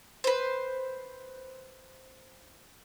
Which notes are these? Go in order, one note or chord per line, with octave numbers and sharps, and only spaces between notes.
B4 C5